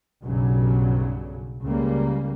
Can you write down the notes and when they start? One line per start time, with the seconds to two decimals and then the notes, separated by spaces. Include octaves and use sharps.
0.23 B1 G2 C#3 F#3
1.62 C#2 C#3 G3 A#3